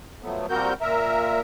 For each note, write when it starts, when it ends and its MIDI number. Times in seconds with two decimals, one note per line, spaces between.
0.23 0.46 53
0.23 0.46 54
0.23 0.46 57
0.23 0.46 59
0.50 0.73 46
0.50 0.73 55
0.50 0.73 60
0.50 0.73 66
0.50 0.73 70
0.50 0.73 91
0.81 1.41 46
0.81 1.41 70
0.81 1.41 76